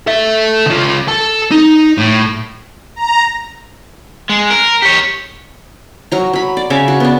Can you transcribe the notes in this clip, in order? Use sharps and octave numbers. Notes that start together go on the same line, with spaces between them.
A4 E5
C#2 F4
A4 A5
D#4
A2
A#5
G#3
A#4
G4 C#5
F#3 A#5
F#3 B5
D5
C#3 C#5 E5 D6
F#4
B3 D4